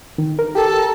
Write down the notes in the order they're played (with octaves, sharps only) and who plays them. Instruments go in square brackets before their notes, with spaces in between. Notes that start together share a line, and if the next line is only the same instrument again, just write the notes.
[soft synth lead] D#3
A#4
[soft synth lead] G4 [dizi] A4
[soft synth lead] A#5